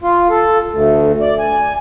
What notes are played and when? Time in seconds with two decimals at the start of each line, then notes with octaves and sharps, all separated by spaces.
0.03 F4
0.30 A4
0.71 D2
1.22 D5
1.39 G#5